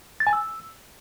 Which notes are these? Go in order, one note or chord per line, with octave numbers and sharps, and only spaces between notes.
A6
G#5
E6